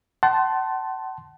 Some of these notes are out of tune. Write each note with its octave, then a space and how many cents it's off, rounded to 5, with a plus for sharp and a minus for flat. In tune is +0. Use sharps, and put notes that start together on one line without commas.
F#5 +40 A5 +0 C6 +0